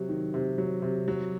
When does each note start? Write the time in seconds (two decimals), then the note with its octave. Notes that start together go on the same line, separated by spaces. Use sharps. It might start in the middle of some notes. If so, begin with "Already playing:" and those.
Already playing: C3 F#3
0.09 D#3
0.34 C3
0.58 F#3
0.82 C3
1.08 F#3